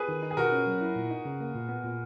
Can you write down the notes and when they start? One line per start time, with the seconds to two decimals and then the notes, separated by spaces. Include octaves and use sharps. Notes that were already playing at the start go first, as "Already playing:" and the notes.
Already playing: G#4 B4
0.08 D#3
0.23 D#4
0.31 G#4
0.37 B2 F#4 A#4
0.52 C#4
0.67 F#3
0.81 E4
0.96 A#2
1.11 D#4
1.25 C#3
1.41 A#3
1.55 A#2
1.69 B3
1.84 A#2